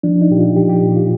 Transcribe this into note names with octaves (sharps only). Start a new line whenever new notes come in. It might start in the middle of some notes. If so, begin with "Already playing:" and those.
F3 D4
D#4
A#2 G4
F4
F3 G4
G4
A#2
F4